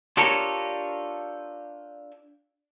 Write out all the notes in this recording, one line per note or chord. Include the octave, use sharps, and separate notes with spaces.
D4 F4 G4 A4 A#4 C#5